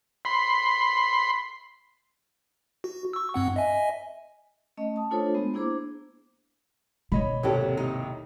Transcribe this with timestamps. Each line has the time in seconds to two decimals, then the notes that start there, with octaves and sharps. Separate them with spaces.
0.25 B5 C6
2.84 F#4
3.13 C#6 E6
3.34 G2 C4 F#5
3.56 D#5 E5 G#5
4.77 A3 C#4 D#5
4.96 A5 D#6
5.11 A3 D4 F4 A4 C5 C#5
5.34 G#3 B3
5.54 A#3 D4 E4 G#4 C5 D6
7.12 B2 C#5 D#5 B5
7.43 G#1 D#2 C3 F#3 G4 A4
7.77 D#4